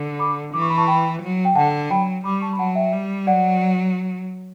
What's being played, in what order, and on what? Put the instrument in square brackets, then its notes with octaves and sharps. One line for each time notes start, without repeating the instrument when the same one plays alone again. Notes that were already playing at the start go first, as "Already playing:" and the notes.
Already playing: [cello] D3
[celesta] B5 D6
[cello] E3 [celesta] D6
[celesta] C#6
B5
A5 C#6
G5 B5
[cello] F#3
[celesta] G5
[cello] D3 [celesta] F#5 A5
[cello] F#3 [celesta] G5 B5
[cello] G3 [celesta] B5 D6
[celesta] A5 C#6
B5
[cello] F#3 [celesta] F#5 A5
[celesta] E5 G5
[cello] G3
[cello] F#3 [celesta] D5 F#5